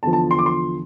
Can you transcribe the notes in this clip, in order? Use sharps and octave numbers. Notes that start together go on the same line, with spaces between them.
E2 D3 F3 A5
A5
C6
D6
C6